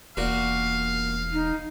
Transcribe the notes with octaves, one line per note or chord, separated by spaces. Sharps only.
E1 A#2 F#4 F5
D#4